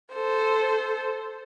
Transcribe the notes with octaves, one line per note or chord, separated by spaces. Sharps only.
A4 C5